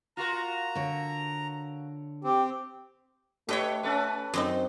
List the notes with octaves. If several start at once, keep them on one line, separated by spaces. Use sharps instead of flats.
F4 F#4 A#4 A#5
D3 C#5
C4 G4
A3 G4 A4 B4 C#5 D#5 G5
C#4 A4 B4
F#2 C4 D#4